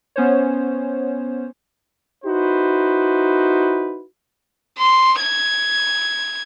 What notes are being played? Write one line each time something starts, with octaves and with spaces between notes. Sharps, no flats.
B3 C#4 C5 C#5
D#4 E4 F#4 B4 C5
C6
G#6